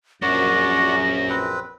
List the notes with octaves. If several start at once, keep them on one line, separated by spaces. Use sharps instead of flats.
A#1 F#2 C#4 F#4 A#4 D5 A#6
C4 B4